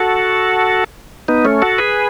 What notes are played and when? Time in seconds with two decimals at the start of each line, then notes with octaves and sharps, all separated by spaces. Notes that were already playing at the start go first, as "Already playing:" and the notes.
Already playing: F#4 A4
1.28 B3 D#4
1.45 A3 C#4
1.62 F#4 A4
1.78 G#4 B4